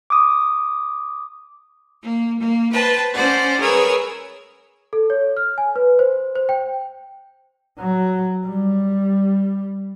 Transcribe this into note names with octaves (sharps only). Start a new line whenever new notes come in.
D6 D#6
A#3
A#3
B4 C5 G5 A5
C#4 C5 D5 F#5
G#4 A#4 B4 C#5 E6
A4
C#5
F6
G#5
B4
C5
C5
G5
F#3
G3